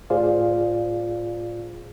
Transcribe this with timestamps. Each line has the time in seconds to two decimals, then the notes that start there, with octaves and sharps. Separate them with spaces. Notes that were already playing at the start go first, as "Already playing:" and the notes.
0.10 A2 F4 G#4 C5 D5 F5